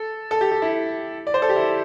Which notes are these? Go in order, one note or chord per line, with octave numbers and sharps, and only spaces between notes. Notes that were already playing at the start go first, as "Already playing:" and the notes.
Already playing: A4
A4
G4
G4
E4
D5
C5
A4
G4
E4